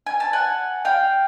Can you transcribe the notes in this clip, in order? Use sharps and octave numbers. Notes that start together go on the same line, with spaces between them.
G#5
A5
F#5 G#5
F5 G5